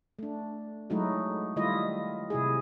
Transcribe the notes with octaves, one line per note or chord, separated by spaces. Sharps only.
A3 D4
F#3 G#3 A3 D#4 E4 F#4
D#3 G3 A3 E4 F4 D#5
C3 E4 G#4